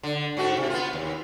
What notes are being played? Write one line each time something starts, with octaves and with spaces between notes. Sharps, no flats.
D3
G#2 A3 F#4
C3
B3 F4
D#2